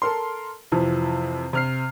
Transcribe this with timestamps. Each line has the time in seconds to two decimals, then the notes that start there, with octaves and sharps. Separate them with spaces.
0.02 A4 A#4 C6
0.72 F2 C3 E3 F3
1.53 C3 F6 C7